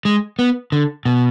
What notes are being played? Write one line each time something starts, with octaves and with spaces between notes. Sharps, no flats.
G#3
B3
D3
B2